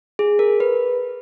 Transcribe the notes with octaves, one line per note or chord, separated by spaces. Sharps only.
G#4
A#4
B4